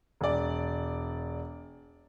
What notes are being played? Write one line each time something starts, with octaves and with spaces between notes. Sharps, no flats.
E1 D5